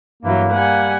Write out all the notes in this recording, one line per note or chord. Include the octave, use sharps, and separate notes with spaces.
G2 E3 F#3 A#3
G3 F#5 G#5